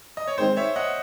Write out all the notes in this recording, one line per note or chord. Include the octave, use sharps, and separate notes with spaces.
D#5
C#5
D#3 G#3 C4 C5
C#5 E5
D#5 F#5